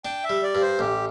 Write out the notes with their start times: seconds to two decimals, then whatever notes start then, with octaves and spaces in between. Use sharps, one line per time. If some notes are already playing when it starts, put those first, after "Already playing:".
0.05 D4 G5
0.24 E5
0.30 G3
0.43 D5
0.55 G2
0.61 C5
0.79 A1 G4